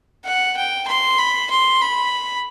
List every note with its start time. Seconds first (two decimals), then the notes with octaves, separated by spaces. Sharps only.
0.25 F#5
0.57 G5
0.88 C6
1.19 B5
1.50 C6
1.81 B5